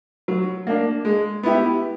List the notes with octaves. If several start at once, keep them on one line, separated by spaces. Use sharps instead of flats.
F#3
A#3 D4
G#3
B3 E4 G4